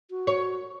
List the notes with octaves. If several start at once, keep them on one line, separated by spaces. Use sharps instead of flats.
F#4
C#5